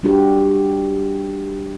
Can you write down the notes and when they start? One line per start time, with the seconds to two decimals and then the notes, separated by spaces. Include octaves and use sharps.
0.03 G3 D4 F#4 G4